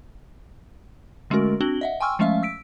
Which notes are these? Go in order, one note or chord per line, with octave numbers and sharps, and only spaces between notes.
D3 G#3 A3 C#4 F#4 A#4
C4 D4 F#4 F#7 G7
D#5 E5 F#5
G5 G#5 C6 C#6 E6 F6
F3 G#3 A3 C#4 E5 F5
E6 B6 D7